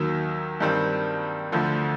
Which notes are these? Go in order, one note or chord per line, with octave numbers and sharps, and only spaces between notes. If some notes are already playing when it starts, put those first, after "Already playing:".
Already playing: D#2 D#3 F#3
G2 D#3 G3 C4
D2 D3 F3